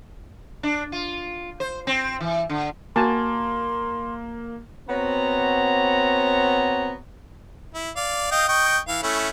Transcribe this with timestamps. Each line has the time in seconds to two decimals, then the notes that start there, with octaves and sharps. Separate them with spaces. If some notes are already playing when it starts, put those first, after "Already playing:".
0.63 D4
0.92 F4
1.60 C5
1.87 C4
2.21 E3
2.50 D3
2.96 A#3 F#4 G#5 A5 C6
4.89 B3 C4 F#4 C#5 A#5
7.75 E4
7.96 D5 F5
8.31 D#5 F5 G5
8.49 D#5 G5 C#6
8.88 E3 F5
9.03 A3 C#4 E4